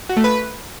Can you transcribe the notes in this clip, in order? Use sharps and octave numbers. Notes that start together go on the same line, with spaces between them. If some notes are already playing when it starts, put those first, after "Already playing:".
F#4
A3
B4